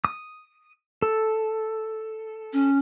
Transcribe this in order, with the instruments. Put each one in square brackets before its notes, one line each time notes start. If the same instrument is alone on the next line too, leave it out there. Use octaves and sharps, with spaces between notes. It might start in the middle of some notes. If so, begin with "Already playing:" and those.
[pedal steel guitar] D#6
A4
[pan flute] C#4